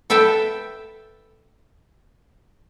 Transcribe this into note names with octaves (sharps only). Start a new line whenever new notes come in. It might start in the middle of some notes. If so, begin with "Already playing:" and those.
A4 B4 E5 G5 A5